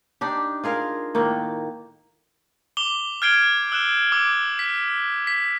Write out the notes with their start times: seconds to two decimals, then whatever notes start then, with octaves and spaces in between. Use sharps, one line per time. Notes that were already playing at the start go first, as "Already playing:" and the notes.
0.21 D4 D#4 G4
0.64 F4 G#4 A#4 F5
1.15 A2 D#3 A#3
2.77 D6 F7 G7
3.22 F6 G6 G#6 C7 D7 G7
3.72 E6 F#6 E7
4.12 D6 E6 D7
4.59 B6
5.27 B6